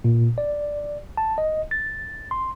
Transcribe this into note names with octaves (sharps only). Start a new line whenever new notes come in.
A#2
D5
A5
D#5
A6
C6